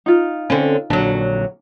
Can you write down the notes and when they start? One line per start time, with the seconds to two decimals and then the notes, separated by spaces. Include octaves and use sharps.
0.06 D#4 F4
0.50 D3 C4 C#4
0.90 A#1 A#2 D3 F#3 D4